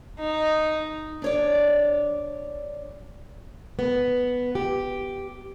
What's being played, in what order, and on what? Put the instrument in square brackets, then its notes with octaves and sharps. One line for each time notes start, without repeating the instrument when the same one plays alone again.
[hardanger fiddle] D#4
[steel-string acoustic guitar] D4 C#5 D5
B3
G4